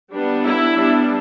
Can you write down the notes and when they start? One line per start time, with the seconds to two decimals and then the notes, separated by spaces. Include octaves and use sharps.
0.12 G3 B3 D4
0.44 E4
0.75 G3 B3 D4